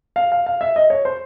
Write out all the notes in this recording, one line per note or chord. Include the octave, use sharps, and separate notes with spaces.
F5
F5
F5
E5
D#5
C#5
C5